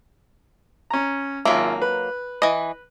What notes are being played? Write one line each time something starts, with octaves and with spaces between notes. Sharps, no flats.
C#4 A#5
G#1 F#3 A#3 F4 E5
B4
E3 D#5